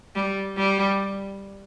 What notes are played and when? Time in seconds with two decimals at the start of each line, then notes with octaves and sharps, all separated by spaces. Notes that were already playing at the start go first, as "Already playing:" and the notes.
0.15 G3
0.58 G3